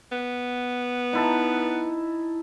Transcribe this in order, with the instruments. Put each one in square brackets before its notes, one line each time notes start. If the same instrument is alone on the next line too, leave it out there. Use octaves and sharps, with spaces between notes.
[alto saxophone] B3
[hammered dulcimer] D#4 E4 A5